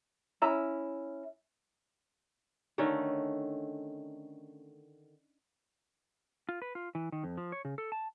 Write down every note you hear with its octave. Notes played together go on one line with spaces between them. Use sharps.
C#4 E4 E5 A#5
D3 D#3 A3 C#4
F4
B4
F4
E3
D#3
F2
F3
C#5
C#3
A4
A5